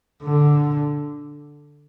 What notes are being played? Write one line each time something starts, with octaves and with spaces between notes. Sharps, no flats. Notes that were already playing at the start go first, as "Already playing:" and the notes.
D3